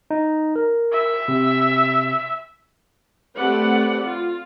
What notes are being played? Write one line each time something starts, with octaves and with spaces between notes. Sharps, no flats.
D#4
A#4
E5
C3
A3 C4 G4 B4 D5 F#5
F4